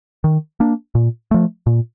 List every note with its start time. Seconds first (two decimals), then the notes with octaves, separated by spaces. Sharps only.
0.24 D#3
0.60 A#3 D4
0.95 A#2
1.31 F3 A3
1.67 A#2